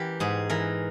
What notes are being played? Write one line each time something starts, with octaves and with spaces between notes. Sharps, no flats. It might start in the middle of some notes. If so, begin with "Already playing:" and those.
Already playing: E3 G4 A#4
G#2 G#4
E3 A#4